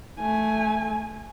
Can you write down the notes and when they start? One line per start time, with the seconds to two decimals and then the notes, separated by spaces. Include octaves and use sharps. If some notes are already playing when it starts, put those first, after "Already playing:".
0.20 A3 G#5